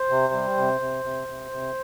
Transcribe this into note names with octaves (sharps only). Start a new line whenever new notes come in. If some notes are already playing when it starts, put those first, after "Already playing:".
Already playing: C5
C3
G3
C3
C3
C3
C3
C3